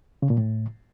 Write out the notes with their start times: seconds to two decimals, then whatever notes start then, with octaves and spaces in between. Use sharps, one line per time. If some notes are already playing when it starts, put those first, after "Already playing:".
0.22 C#3
0.30 A#2
0.38 A2